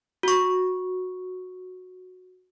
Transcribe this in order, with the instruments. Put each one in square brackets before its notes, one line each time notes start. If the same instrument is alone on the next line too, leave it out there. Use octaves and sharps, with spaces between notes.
[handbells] F#4 C#6